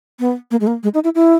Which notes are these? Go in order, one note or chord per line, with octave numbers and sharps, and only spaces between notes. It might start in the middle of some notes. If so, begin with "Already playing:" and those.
B3
A#3
G#3
A#3
G#3
D#4
E4
E4